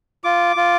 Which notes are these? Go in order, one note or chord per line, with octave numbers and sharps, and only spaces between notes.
F4 D6
F4